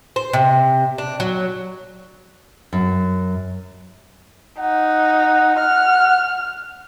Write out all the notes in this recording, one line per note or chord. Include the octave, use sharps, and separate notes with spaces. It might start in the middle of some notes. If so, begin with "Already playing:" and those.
C5
C3
D4
F#3
F#2
D#4 F#5
F6